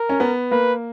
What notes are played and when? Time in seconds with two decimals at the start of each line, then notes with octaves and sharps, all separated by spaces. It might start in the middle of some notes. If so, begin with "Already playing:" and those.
Already playing: A#4
0.09 C#4
0.20 B3
0.51 A#3 B4